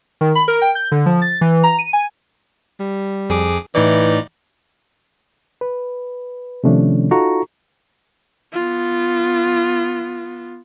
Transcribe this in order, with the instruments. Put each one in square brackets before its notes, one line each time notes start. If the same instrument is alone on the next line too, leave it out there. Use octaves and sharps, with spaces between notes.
[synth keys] D#3
B5
A#4
G5
G6
D3
F3
A6
E3
A#5
D#7
G#5
[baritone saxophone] G3
[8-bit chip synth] F2 G#4 D6
[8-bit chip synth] A2 D#4 D5 [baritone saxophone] E3
[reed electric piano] B4
C3 D#3 F3 A3 C#4 D4
D#4 F4 F#4 A4 A#5 C#6
[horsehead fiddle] B3 F4